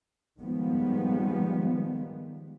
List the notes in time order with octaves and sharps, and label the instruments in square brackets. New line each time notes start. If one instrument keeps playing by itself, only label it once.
[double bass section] D#3 F3 G3 G#3 B3